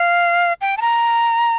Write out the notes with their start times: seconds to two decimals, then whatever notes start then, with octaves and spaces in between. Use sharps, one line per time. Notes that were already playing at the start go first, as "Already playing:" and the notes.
Already playing: F5
0.61 G5
0.77 A5
0.81 A#5